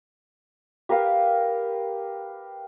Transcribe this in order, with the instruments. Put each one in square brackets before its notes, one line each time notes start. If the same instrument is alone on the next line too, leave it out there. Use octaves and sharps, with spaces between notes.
[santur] G4 A#4 B4 F5